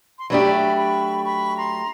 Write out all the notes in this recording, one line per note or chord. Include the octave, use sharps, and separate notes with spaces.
C6
F#3 A3 D4 G4 B5 C#6
B5 C#6
B5 C#6
A#5 C6